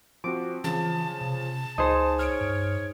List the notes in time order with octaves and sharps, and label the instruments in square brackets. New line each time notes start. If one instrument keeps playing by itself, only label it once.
[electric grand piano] F3 C4 F#4 [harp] D6
[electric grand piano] C#3 F3 [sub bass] E3 [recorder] A5
[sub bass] C3
[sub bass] C#2 [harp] D#4 G#4 C5 [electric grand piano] D#6
[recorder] C#5 [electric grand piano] F6 D7
[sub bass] G2